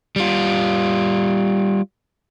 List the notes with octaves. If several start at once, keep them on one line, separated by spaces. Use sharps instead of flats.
G3 F4